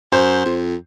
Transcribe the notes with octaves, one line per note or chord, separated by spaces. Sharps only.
F#2 C5
F2